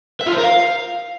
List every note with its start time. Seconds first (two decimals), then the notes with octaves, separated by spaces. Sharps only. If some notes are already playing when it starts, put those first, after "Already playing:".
0.21 E5
0.26 F4
0.32 C5
0.38 A#4
0.43 F5